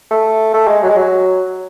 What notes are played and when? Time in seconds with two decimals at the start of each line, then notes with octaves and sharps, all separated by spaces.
0.11 A3
0.54 A3
0.68 G#3
0.83 F#3
0.89 G#3
0.96 F#3